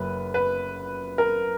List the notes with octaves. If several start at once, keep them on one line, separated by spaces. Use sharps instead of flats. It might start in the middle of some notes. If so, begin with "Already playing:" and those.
Already playing: F#1 C#3 F#3 B4
B4
A#4